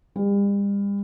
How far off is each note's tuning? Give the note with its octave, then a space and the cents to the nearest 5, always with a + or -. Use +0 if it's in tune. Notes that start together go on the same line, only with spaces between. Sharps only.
G3 +40